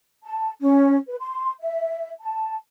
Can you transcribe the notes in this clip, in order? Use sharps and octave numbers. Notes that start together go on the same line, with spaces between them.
A5
C#4
B4
C6
E5
A5